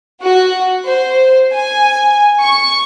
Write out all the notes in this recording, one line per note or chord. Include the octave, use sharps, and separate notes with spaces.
F#4
C5
G#5
C#6